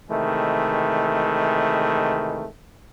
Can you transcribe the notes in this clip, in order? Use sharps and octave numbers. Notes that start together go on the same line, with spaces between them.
C3 D#3 E3 G#3 A3